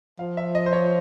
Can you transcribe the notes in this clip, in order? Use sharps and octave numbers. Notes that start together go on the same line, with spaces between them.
F3 F5
E5
D#5
C5
C#5